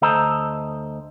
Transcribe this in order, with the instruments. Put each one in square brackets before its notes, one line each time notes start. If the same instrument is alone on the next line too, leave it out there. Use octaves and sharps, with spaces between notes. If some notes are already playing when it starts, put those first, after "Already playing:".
[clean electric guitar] D2 A4 C5 D#5 A5 A#5